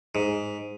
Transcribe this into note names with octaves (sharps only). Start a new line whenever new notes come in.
G#2